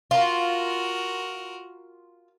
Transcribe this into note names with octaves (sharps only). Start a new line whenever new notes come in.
F4 F#4 A#4